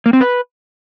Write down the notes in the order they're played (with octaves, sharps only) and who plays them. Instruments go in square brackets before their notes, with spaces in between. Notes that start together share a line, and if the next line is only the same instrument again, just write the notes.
[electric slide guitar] A#3
C4
B4